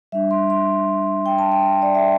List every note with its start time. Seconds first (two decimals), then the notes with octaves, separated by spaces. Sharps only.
0.12 G3 D4 E5
0.31 C6
0.50 C6
1.26 G5
1.38 A5
1.52 G5
1.82 D5
1.95 E5